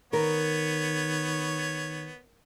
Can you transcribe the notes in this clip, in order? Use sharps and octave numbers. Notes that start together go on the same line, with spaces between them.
D#3 B3 A#4 C#5